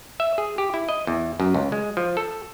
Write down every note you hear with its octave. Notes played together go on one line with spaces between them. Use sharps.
E5
G#4
G4
E4
D#5
E2
F#2
C#2
G#3
F3
A4